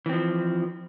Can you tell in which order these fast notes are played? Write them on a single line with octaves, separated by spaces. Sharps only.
E3 C4 F3